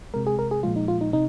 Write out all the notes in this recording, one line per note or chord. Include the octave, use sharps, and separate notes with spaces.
C3 G#3 A#4
G#4
A#4
G#4
A#2 F3 G#3 F4
D#4
F4
D#4
C3 D#4